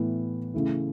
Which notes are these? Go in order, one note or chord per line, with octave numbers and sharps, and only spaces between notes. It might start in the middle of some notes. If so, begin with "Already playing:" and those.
Already playing: A2 E3 B3 E4
C#3 E3 A3 E4